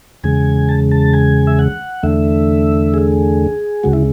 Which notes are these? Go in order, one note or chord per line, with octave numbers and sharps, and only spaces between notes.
E2 C#3 G#3 G#5
A5
A5
G#5
E5
F#5
E2 D3 A3 E5
G#4
D2 C#3 G#3 F#4
E4